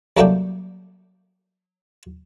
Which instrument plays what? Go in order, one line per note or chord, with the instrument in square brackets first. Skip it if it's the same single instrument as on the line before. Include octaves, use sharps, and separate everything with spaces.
[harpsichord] C2 F#3 A3 A#3 D4 G5